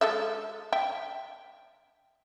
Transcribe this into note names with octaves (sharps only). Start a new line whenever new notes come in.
G#3 A4 E5
E5 G5